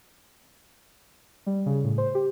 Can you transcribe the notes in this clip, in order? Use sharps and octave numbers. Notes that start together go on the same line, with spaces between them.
G3
C#3
A2
C5
G4